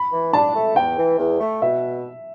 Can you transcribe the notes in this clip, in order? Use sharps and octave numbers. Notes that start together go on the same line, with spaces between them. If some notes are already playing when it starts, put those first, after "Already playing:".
Already playing: B5
E3
D4 A5
A3
E2 G5
E3
E2
A3
B2 E5